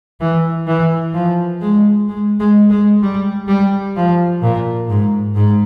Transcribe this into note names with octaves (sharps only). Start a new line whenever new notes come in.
E3
E3
F3
G#3
G#3
G#3
G#3
G3
G3
F3
A#2
G#2
G#2